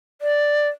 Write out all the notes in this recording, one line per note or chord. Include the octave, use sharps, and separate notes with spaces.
D5